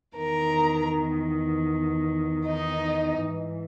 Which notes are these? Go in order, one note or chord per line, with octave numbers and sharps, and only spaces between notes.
E2 D#3 A#4 A#5
D#4 D#5
G#2 E3